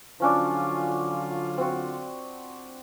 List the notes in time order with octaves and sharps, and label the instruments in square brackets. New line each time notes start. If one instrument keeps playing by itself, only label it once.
[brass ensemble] D3 F#3 F4 [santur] F3 C#4 D4
[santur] C4 F#4